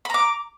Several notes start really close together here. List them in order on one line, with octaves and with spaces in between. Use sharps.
B5 A#5 D6